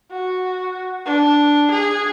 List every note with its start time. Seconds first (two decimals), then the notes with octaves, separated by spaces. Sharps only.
0.12 F#4
1.06 D4
1.71 G#4